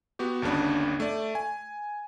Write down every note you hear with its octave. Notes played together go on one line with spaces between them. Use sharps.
B3 F#4 G4
G1 D#2 C#3 D4 B5
A3 D5
G#5